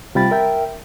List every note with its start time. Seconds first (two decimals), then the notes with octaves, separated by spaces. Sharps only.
0.15 C3 G3 F4 G5 B5 A6
0.31 A#4 E5 G5